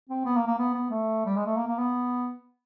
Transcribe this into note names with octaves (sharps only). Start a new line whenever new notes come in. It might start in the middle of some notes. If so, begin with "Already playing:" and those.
C4
B3
A#3
A#3
B3
B3
A3
G3
G#3
A3
A#3
A#3
B3